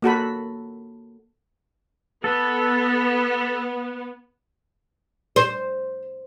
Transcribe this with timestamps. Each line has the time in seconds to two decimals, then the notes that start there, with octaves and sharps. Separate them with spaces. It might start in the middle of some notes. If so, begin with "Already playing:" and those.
0.02 A#3 F#4 A4 B5
2.24 B3 A4
5.36 C5